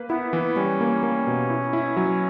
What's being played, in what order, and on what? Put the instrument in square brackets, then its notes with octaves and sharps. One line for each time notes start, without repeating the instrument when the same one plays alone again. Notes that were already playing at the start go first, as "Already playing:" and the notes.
Already playing: [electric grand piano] A#3 B4
[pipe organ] B3 [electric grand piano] E4
[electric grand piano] E3
[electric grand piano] G3 [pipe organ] C#4
[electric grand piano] A#3
A#3
B2
E4
E4
F#3